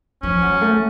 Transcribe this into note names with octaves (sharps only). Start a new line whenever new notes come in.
F3 C#4
F#3
A3